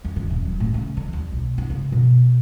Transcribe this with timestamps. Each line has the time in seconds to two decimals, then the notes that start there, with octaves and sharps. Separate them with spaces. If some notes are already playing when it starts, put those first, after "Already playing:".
0.05 F2
0.16 D3
0.30 D#1
0.45 F#3
0.60 A2
0.74 C#3
0.97 D3
1.13 D#2
1.32 B1
1.58 D#4
1.70 C#3
1.92 B2